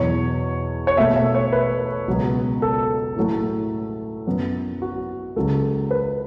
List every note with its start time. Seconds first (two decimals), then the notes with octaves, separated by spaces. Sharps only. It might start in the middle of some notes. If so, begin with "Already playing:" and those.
Already playing: E2 B2 F#3 C#5
0.87 C#5
0.97 B2 A3 E5
1.16 E5
1.35 C#5
1.53 B4
2.08 C#2 B2 F#3 B3
2.62 A4
3.16 A2 F#3 A3
4.27 F#2 F#3 B3
4.82 F#4
5.36 C#2 C#3 F#3 A4
5.91 B4